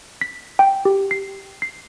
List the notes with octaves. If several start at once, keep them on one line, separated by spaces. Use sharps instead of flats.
B6
G5
G4
C7
C7